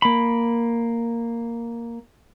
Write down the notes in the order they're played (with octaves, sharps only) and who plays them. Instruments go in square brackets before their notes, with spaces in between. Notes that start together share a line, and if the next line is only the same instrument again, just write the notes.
[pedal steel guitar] A#3 B5